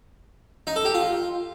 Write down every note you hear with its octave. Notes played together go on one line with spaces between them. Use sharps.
D#4
A4
G4
F4